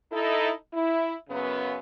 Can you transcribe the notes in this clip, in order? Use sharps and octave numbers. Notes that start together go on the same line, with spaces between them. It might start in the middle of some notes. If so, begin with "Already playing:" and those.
D#4 E4 A4
E4
F#2 C#3 B3